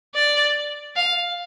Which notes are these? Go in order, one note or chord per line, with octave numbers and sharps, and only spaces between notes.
D5
F5